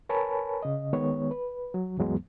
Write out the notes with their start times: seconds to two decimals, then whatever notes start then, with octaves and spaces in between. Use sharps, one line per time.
0.09 A#4 B4 C#5 G#5 A5 B5
0.63 C#3 D#5
0.93 D#3 G#3 B3 C#5
1.31 B4
1.74 F#3
1.97 D2 G2 E3 F#3 G#3 B3